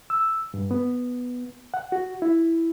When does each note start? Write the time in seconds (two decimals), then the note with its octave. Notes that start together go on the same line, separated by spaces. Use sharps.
0.10 E6
0.54 G2
0.71 B3
1.74 F#5
1.92 F#4
2.22 E4